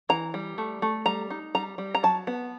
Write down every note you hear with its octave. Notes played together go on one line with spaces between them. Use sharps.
E3 A#5
G3
A3
A3
G3 A#5
D#4
G3 A#5
G3
A#5
F#3 A5
B3